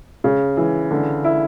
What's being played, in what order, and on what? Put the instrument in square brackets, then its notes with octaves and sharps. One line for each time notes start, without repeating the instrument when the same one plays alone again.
[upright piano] C#3
E3
D3
E4